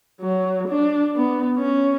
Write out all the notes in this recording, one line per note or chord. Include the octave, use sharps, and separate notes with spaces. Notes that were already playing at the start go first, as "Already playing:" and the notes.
F#3
D4
B3
C#4